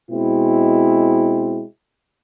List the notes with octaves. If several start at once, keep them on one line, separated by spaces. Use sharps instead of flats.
B2 G#3 C4 E4